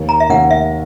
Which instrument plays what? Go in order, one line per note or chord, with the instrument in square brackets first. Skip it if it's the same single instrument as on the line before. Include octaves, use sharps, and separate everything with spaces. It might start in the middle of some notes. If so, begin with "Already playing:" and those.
Already playing: [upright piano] D#2
[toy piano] A#5
E5
[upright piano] D#2 [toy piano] F#5
[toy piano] E5